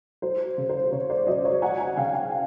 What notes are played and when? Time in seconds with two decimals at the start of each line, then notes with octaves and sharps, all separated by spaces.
0.22 F#3 C5
0.58 C#3
0.69 C5
0.92 C#3 C#5
1.10 C5 D5
1.27 F#3 C#5 D#5
1.45 C#5 D#5
1.62 F#3 F#5 G#5
1.80 F#5 G#5
1.97 C#3 F5 G5
2.14 F5 G5